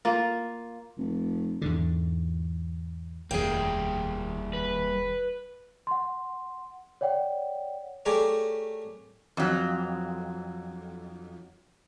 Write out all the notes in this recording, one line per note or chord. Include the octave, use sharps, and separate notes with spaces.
A#3 F4
F1
E2 G#2 D3
F1 D#2 G3 A#3 G#4 G5
B4
F#5 C6
C#5 D5 F#5 G5
A3 G4 G#4 A#4 C#5 D5
F2 F#3